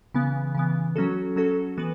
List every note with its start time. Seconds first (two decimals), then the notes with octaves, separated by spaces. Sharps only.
0.14 C#3 E3 B3
0.55 C#3 E3 B3
0.96 F#3 C#4 F#4 A4
1.36 F#3 C#4 F#4 A4
1.77 E3 B3 F#4 B4